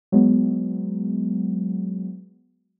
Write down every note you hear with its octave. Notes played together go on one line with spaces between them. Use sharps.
F#3 G#3 B3